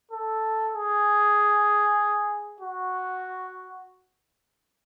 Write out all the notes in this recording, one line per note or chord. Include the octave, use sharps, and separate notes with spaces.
A4
G#4
F#4